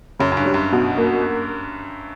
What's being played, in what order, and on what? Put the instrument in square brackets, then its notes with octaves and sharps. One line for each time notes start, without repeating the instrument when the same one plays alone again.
[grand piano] F#2 [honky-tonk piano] C#3
[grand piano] F#2
G2
[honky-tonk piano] G3
[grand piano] F#2
[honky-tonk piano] B2
A#3